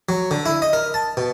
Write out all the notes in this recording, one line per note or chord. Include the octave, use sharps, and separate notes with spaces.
F#3
D3
E4
D#5
A#4
A5
B2